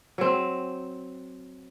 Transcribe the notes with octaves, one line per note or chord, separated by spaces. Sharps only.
F#3 C4